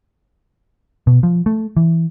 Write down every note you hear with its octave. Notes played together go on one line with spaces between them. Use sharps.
B2
F3
A3
E3